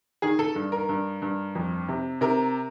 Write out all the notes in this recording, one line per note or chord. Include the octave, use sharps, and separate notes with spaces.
D#3 G#4
A4
G2
A#4
G2
G2
F2
C3
C3 A#4